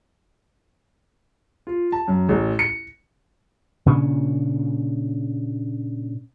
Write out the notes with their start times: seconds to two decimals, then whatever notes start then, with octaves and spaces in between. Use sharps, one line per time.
1.67 F4
1.92 A5
2.08 F#2
2.29 A1
2.59 C#7
3.86 A#2 C#3 C#4 D4